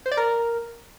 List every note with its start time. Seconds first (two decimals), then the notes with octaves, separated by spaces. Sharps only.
0.06 C5
0.11 D5
0.17 A#4